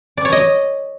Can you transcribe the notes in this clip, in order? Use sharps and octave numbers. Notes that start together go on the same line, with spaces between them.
D5
C#5
D#5